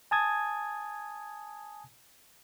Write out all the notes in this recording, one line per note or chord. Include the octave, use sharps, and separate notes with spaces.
G#5 A5 D#6 G#6